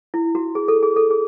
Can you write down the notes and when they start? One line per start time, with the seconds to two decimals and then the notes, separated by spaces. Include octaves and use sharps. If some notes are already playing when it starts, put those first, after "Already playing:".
0.14 E4
0.35 F#4
0.55 G#4
0.68 A4
0.83 G#4
0.96 A4
1.10 G#4